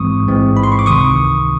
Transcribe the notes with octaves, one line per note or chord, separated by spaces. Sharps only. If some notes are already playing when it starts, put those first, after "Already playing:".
Already playing: A1 G#2 E3 G#3 C4 C#6 D#6
A1 G#2 E3 G#3 C4
B5
C6
C#6
D6
C#2 C3 D#3 C#6 D#6